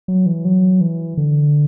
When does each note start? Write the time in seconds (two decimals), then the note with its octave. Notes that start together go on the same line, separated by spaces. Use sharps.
0.08 F#3
0.26 E3
0.45 F#3
0.81 E3
1.17 D3